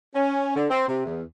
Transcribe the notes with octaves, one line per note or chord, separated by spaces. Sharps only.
C#4
D3
C4
C3
E2